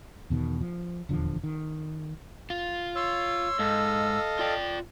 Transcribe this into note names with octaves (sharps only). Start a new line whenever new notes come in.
E2 B2 D#3
F3
D#1 E2 D3 F3
D#3
F4
C#5 C6 E6
G#2 A4 D#5 F5
F4 D5 G5